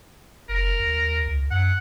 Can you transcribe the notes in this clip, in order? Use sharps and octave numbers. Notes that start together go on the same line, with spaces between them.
F#1 A#4
D#2
C#2
F#2 F#5